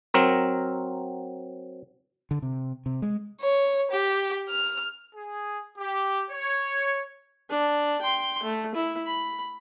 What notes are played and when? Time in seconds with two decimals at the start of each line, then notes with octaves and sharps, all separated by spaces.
0.14 F#3 C4 A#4
2.31 D3
2.42 C3
2.86 C3
3.02 G#3
3.41 C#5
3.91 G4
4.49 F6
5.14 G#4
5.78 G4
6.30 C#5
7.50 D4
8.02 G5 C6
8.43 A3
8.75 E4
9.07 B5